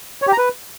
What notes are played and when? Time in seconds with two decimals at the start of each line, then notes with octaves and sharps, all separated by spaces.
0.22 C#5
0.27 G4
0.33 A#5
0.38 B4